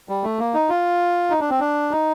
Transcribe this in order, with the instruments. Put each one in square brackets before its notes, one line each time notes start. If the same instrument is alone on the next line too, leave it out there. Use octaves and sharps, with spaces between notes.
[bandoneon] G3
A3
A#3
D#4
F4
D#4
D4
C4
D4
D#4